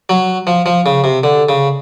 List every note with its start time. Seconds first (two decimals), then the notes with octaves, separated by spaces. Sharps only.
0.09 F#3
0.47 F3
0.66 F3
0.86 C#3
1.04 C3
1.23 D3
1.49 C#3